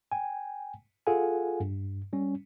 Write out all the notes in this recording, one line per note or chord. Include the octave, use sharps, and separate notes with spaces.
G5 G#5
F4 G#4 A4 F5 F#5 G#5
G2
G3 C#4